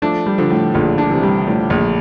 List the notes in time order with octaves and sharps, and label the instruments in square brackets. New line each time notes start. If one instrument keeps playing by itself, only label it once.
[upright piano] F3 A3 [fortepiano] D4
[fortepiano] G3
[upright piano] D3 F3
[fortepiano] A2
[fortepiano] A#1 [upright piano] D3 F3
[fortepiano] D4
[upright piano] C3 E3
[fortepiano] G3
[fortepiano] A2 [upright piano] D3 F3
[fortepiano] A#1